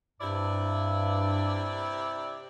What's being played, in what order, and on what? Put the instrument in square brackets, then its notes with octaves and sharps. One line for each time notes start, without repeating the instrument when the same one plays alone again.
[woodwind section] G2 [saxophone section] C3 E4 D5